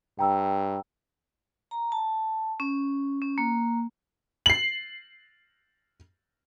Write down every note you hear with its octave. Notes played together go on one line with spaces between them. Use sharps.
G2 G5 A#5 E6
A#5
A5
C#4
C#4
A#3
C7 F#7